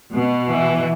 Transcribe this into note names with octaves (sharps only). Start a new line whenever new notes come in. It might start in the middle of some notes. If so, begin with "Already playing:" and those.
B2
E3